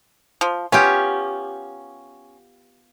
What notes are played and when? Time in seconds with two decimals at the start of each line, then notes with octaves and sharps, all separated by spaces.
0.41 F3
0.72 B3 C#4 F4 G4